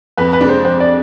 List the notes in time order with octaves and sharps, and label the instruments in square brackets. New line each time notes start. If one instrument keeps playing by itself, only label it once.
[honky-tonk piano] F2 [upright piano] B4
[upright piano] B4
[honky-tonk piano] C3 G#3 D4
[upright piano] C5
[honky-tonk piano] F2 [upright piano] C5
[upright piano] D5